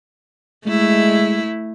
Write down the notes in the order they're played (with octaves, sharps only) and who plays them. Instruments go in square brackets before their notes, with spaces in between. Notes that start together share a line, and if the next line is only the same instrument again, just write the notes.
[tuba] G#3 [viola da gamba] A3 E4